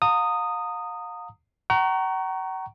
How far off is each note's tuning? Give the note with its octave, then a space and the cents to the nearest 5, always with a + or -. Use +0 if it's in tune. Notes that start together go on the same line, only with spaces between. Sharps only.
F5 +35 A#5 -35 D#6 -5
F#5 +45 A#5 +0 C#6 +0